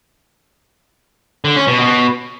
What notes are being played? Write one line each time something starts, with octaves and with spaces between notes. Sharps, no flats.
D3
C#4
B2
B2